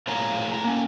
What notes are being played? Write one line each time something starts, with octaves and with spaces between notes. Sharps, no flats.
A2 F4 G#4 C#5 F5 A#5
A2 A#5
A#3 C#4